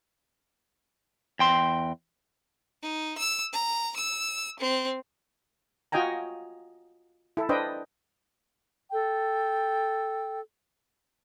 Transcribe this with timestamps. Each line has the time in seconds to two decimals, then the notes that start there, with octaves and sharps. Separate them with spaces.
1.39 E2 G5 C6
2.82 D#4
3.17 E6
3.53 A#5
3.96 E6
4.59 C4
5.92 F4 F#4 D#5 G5 G#5 A#5
7.37 E4 A4
7.49 D4 B4 C5 D#5 G5
8.91 A4 G5